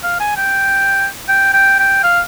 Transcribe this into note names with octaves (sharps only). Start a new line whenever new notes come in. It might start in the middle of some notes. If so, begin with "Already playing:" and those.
F5
G#5
G5
G5
G5
G5
F5